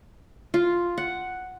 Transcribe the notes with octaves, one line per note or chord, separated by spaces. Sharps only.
F4
F#5